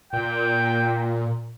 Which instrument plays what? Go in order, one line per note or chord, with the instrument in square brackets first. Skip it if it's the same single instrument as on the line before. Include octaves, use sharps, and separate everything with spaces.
[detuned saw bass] A#2 [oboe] G5